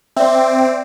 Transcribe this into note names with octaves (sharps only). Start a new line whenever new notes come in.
C4 D5 E5